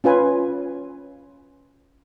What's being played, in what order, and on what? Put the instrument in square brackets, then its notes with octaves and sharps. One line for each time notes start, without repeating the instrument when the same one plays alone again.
[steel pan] C#4 F4 B4 G#5